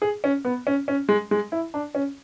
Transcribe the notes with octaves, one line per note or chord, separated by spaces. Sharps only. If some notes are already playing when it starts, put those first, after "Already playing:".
G#4
C#4
B3
C#4
C#4
G#3
G#3
E4
D4
C#4